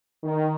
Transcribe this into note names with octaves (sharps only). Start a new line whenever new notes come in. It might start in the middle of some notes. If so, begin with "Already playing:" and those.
D#3